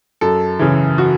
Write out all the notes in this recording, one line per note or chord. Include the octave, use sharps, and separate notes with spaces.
F#2 A4
C#3 E3
F#4